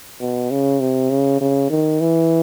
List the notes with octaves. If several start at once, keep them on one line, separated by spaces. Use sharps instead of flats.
B2
C#3
C3
C#3
C#3
D#3
E3